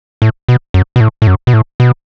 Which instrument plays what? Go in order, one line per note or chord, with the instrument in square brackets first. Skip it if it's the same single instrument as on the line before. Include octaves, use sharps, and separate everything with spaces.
[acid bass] A2
B2
F#2
B2
A2
A2
F#2
B2
A2
B2